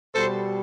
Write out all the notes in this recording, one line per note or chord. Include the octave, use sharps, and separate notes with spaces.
B2 G3 A4 C5